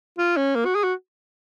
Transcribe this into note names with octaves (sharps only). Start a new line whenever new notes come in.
F4
C#4
A#3
F#4
G#4
F#4